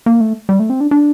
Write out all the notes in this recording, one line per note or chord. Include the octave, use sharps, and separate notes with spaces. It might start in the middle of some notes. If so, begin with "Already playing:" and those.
A#3
A3
G3
A3
C4
D4
D4